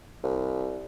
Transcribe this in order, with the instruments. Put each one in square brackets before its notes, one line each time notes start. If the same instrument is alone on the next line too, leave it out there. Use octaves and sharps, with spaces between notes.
[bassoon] C2